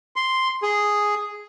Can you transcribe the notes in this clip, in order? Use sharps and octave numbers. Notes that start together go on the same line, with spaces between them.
C6
G#4